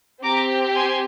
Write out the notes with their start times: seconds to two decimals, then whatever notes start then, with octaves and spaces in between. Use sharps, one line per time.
0.23 C4 G4 A#5 D6
0.75 G#5 C6